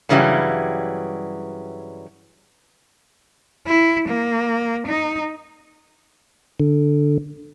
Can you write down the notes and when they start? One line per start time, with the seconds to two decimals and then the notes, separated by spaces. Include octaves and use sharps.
0.09 G2 C#3 E3 F#3 G3
3.67 E4
4.09 A#3
4.87 D#4
6.60 D3